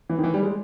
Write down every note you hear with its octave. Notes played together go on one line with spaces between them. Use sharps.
E3
D#3
E3
G3
G#3